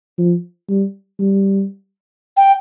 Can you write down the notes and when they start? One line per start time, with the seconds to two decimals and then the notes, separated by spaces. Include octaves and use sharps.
0.19 F3
0.69 G3
1.19 G3
2.37 G5